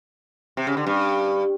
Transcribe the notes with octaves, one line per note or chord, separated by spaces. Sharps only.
C3
C#3
D3
G2